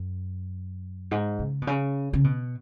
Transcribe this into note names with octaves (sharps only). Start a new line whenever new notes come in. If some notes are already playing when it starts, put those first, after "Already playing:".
Already playing: F#2
G#2
C#3
B2
C#3
C#3
B2